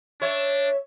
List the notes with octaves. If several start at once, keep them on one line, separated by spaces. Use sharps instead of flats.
D4 C#5 E5